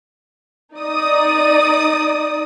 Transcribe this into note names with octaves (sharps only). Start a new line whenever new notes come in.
D#4 D5 D#6